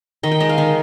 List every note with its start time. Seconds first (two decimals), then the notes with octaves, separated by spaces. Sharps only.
0.23 D#3 D#5
0.32 G5
0.40 G#3 D#5
0.49 F5
0.58 D#3